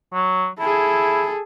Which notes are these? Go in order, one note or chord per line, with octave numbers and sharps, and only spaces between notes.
F#3
E4 G#4 A4